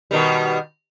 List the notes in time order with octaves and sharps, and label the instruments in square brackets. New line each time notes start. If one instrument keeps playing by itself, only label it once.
[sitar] B2 D#3 G3